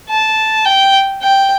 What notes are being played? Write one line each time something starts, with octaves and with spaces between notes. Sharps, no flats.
A5
G5
G5